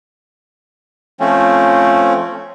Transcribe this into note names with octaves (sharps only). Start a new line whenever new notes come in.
F3 A3 C4 C#4